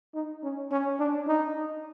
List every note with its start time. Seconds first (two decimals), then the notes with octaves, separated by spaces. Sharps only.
0.15 D#4
0.44 C#4
0.72 C#4
1.00 D4
1.27 D#4